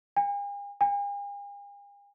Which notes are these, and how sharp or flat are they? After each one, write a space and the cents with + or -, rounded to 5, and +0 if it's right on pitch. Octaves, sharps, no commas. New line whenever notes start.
G#5 -45
G#5 -45